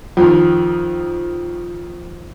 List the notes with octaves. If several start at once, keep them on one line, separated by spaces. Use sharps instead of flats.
F2 D#3